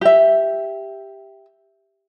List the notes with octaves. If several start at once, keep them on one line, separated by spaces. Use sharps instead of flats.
G4 E5